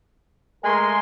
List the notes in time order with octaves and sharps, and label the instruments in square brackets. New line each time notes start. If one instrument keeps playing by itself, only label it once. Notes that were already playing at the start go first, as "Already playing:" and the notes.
[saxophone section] G#3 A3 [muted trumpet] A#4 [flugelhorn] G#5 [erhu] C6